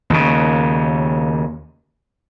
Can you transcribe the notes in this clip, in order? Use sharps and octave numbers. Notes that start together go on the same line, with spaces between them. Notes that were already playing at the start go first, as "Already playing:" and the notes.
D#2 C#3